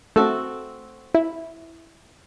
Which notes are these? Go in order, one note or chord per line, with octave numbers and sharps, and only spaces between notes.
A3 C4 F#4 A4
E4